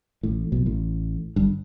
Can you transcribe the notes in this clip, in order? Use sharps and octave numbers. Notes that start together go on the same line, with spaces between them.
A1 A2
B1 B2
A1 A2
G1 G2